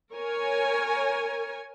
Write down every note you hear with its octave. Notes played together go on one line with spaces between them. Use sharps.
A#4 C#5 G#5